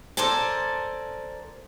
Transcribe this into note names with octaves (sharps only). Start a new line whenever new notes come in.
A4 A#4 C5 D5 G#5 A5